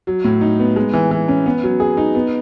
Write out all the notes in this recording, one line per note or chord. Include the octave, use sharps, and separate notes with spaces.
F#3
A2
D#4
B3
G#3
E3
E3
C#4
B3
F#3
G#4
D#4
B3